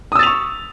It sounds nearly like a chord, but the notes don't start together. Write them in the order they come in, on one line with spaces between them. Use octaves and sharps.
D#6 E6 A6 F7 C#6